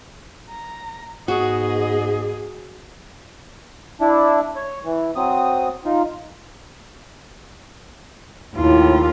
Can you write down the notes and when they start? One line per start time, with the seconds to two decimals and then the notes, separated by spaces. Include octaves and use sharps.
0.50 A#5
1.28 G#2 B3 F#4 G#4 D#5
4.01 D4 E4
4.56 C#5
4.85 E3
5.16 F#3 C4 D#6
5.85 D#4 F4
8.55 D#2 A2 F4